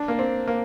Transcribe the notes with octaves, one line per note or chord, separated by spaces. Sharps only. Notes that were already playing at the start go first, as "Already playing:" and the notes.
Already playing: D4
A#3
C4
A#3